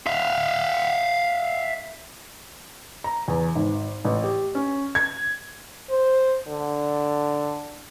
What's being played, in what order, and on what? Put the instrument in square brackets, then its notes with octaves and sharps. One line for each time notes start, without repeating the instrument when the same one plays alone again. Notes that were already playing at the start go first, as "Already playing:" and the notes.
[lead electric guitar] E5 F5
[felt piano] A#5
E2
G#1
A1
G4
C#4
G#6
[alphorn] C5
D3